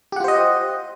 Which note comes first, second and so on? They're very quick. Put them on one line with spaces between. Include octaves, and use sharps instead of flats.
G4 F#5 F4 C5 D#5